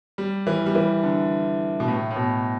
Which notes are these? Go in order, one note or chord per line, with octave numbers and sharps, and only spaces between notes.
G3
E3
G3
E3
D3
B2
A2
A2
B2